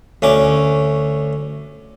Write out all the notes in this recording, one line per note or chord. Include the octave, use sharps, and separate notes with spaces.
D2 C#4 D6